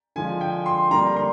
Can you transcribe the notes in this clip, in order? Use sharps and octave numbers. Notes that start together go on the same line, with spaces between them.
D3 F3 G#3 G#5
G5
C6
D3 G3 A#3 A#5
C6